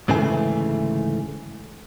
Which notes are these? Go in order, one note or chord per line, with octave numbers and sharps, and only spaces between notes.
D2 G#2 C#3 E3 A3 G#5